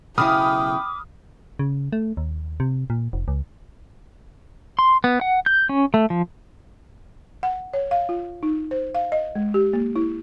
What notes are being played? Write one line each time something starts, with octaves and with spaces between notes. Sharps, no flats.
B1 C#3 E4 G5 B5 D6 D#6 F6
C#3
A3
D#2
C3
A#2
F1
C#2
C6
B3
F#5
G6
C#4
A3
F3
F#5
C#5
F5
F4
D#4
C5
F5
D#5
G#3
G4
A#3
E4